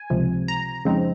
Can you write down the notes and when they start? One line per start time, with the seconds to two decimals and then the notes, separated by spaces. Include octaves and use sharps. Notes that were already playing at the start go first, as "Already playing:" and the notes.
Already playing: G#5
0.10 C#2 C3 F3
0.48 A#5
0.85 F2 C#3 G#3 C4 D#4